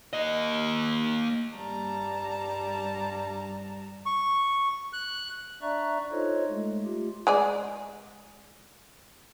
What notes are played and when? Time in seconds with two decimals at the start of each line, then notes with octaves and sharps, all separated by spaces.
0.13 A#3 D#5
1.56 G2 G3 A5 A#5
4.06 C#6
4.93 F#6
5.62 D4 D5 E5 A#5 C#6 F#6
6.12 D#4 F4 A4 C5 C#5 D#5
6.50 G#3 A3
6.84 A3 F4 G4
7.27 G#3 G#4 D5